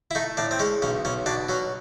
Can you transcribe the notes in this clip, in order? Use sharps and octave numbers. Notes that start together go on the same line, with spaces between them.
E4
A3 D#4
A2 D4
C4
G#3 C#4
B1 C#4
B1 C#4
B2 D4
F#3 C#4